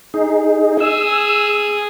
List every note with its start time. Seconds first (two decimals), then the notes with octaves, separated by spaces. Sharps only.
0.14 D#4 G#4
0.80 G#4 E6